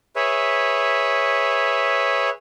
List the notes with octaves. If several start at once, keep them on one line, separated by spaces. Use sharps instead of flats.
G#4 B4 C#5 E5